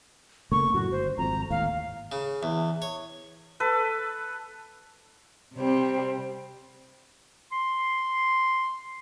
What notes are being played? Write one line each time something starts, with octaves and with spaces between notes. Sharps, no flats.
C#3 A3 A#3 C#6
F#2 A2 F#4
G1 C5
G#1 F2 A#5
G#1 D#2 A2 F5
C#3
E2
C#5
A4 B4
C3 G3 C4
C6